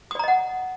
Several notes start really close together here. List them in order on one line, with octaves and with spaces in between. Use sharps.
D#6 D5 A#5 D#5 F#5